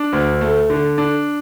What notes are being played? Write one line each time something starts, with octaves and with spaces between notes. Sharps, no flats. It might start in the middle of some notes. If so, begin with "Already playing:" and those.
Already playing: D4
D2
A3
D3
D4